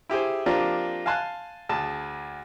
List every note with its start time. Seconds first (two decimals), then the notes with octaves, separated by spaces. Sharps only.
0.10 E4 G4 G#4 C5
0.46 F3 A#3 C4 D4 F4 G4
1.06 F5 G#5 A5 C6 F#6
1.69 D2 G#4 A5